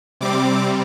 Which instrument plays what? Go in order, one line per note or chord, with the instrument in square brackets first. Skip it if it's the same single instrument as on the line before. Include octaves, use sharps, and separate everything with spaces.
[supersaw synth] C3 G3 C4 D6